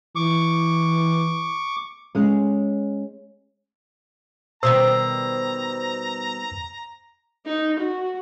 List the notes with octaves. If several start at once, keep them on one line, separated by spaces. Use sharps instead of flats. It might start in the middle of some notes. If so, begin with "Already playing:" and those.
E3 C#6 D6
G#3 C#4
B2 D#3 G3 C5 A#5 E6
D#4
F#4